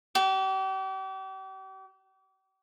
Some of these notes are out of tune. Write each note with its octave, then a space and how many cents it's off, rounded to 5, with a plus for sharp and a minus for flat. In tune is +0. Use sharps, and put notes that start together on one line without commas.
G4 -40